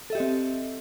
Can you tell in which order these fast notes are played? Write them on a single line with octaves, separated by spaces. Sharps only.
A4 E5 G4 D#5 C4